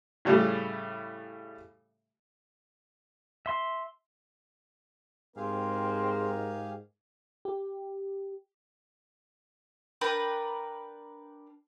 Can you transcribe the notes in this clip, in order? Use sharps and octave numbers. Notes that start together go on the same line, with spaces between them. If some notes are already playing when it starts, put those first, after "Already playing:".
A2 C#3 G3 A3
E5 C6
G#2 C4 G4 G#4 A#4 F5
G4
D4 A#4 B4 G5